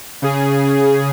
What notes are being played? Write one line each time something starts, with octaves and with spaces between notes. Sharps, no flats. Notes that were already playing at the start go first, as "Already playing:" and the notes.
C#3 G#4